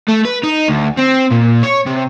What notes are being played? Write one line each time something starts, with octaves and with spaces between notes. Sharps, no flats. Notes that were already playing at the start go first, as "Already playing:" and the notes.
A3
B4
D#4
D2
C4
A#2
C#5
C3